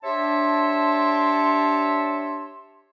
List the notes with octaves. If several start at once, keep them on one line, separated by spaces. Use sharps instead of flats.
D4 G4 C#5 E5 A5 C6